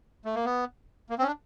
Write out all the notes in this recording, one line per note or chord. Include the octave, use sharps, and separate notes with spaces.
A3
A#3
B3
A#3
C4
C#4
D4